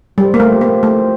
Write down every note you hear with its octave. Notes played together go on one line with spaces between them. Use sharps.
F3 G3 C4 G4 C5
A#3
A3
A#3
A3